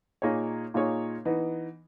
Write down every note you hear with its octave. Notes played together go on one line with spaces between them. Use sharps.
A#2 A#3 D#4 G#4 C#5
A#2 A#3 D#4 G#4 C#5
E3 B3 D#4